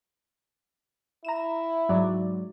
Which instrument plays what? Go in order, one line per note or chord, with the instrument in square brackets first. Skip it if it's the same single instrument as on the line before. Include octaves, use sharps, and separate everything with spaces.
[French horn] E4 [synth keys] A#5 E7
[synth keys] G#2 F#3 D5